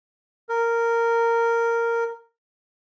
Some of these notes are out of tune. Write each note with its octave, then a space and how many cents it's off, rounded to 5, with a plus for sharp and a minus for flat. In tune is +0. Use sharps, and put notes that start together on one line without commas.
A#4 -10